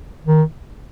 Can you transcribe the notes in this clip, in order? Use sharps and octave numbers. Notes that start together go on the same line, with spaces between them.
D#3